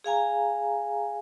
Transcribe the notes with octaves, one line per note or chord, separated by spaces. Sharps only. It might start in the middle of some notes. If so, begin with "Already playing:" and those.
G#4 F5 G#5 A#5